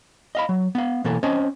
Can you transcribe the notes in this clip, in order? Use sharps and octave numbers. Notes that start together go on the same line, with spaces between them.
D#5 F5 B5
F#3
B3 F5
B2 E3 A#3 A4
C4 C#4 C5 D#5 A5